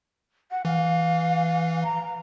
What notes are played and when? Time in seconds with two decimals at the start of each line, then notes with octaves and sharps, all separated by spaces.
0.51 F#5
0.65 E3 F5
1.83 A#5